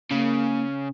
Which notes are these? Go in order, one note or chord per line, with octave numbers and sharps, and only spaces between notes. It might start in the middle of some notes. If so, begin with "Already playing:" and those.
C#3 A#3